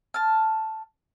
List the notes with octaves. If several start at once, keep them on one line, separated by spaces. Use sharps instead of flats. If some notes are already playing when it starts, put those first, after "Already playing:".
A5 F6